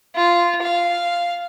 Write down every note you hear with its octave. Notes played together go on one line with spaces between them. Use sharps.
F4
F5